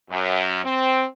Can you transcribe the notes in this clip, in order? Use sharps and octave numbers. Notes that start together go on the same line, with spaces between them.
F#2
C4